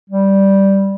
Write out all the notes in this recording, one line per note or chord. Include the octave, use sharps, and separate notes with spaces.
G3